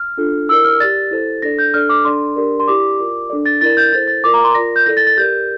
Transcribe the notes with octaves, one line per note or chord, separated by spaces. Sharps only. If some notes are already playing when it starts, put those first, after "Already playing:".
Already playing: F6
D4 F4 A4
E4 A#4 D5 E6
F6
G4 D5 A6
E4 A4 C5
D4 A4 D5 A#6
G6
D4 A4 D5 F6
D6
D4 A4 D5 C6
D4 G4 A#4 D5
C6
E4 G4 D5 D6
F4 A#4 D5
D4 A4 D5
A6
E4 A#4 D5 A6
G6
E4 A4 C5 A6
A6
F4 A#4 D5 D6
A#5
C6
F4 A#4 D5 A#6
G6
E4 A4 D5 A#6
A6
A6
G4 A#4 D5 G6